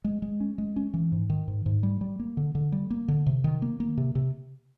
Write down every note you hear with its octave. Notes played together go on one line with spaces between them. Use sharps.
G#3
G#3
C#4
G#3
C#4
E3
G#2
D#3
G#2
G#2
G3
G3
A#3
D3
D3
G3
A#3
D3
C3
D#3
A#3
A#3
C3
C3